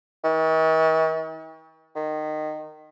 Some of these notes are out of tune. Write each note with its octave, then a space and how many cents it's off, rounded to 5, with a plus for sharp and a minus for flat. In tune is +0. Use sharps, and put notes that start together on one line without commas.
D#3 +45
D#3 -20